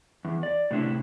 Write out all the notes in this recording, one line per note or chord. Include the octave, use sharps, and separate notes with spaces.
E2
D5
A2 C3 D4 E4